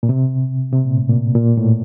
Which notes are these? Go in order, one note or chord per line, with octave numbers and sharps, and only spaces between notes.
A#2
C3
C3
A#2
A2
A#2
A#2
A2